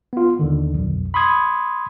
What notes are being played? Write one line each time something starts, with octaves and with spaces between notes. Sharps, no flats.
B3 F4
D#2 D3 D#3
B1 F2
B5 C6 D#6 G#6